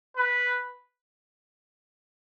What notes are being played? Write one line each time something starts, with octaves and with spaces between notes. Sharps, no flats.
B4